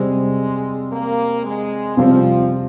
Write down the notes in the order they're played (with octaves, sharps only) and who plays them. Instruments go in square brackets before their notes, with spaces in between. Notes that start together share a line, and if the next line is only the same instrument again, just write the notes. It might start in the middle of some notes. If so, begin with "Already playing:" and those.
Already playing: [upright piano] C3 G3 C4 [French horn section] G#3
[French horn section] A#3
G#3
[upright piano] C3 G3 C4 F4 C5 [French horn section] F3